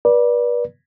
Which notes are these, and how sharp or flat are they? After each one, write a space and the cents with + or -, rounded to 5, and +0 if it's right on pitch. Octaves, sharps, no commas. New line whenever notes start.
B4 -35 D5 +0